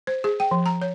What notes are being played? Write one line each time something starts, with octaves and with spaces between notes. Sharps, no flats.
C5
G#4
G5
F3
A#5
C#5